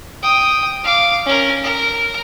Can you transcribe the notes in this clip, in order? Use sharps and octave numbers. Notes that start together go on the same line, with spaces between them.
G5 D#6
F5 D6
C#4 A#4
A#4